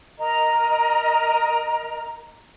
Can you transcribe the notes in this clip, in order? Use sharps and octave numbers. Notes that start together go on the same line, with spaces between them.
A#4 D#5 A#5